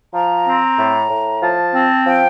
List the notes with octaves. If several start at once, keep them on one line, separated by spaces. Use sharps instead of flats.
F3 A#5
C4
A2
A2
F3 A5
C4
F3 G5